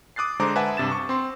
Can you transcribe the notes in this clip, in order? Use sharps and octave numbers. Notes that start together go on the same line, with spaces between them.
D6 D#6 F#6 A6 C7
D3 G#3 C5 A#5 C6 D6
B4 E5 F#5 G#5 A5
G2 C3 A6 E7
C#6
C4 C6